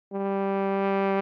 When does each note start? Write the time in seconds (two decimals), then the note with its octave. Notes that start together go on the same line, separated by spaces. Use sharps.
0.12 G3